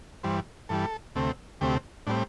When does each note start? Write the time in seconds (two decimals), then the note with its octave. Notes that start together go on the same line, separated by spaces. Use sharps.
0.23 G2 E3 G3 C5
0.69 G2 E3 G3 A4
1.15 D2 C3 A3 C4
1.61 D2 C3 A3 C4 G4
2.07 A2 G3 C4 D4